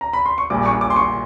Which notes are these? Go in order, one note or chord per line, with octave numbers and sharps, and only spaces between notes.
A#5
B5
C6
C#6
A#1 A#2 G3 D6
C#6
D6
C6
C#6